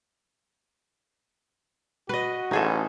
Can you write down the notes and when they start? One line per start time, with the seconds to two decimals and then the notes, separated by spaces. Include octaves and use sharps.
2.09 F#4 B4 D#5
2.51 A1 D#4 G#4 A4